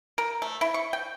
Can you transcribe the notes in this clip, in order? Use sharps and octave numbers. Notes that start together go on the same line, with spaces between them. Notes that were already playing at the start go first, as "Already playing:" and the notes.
A#4
A3
E4
C#6
G5